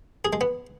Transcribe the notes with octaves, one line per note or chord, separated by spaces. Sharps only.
G#4
G#3
B3